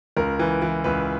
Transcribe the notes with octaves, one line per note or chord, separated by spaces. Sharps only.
C#2 A#4
E3
E3
C#2 B4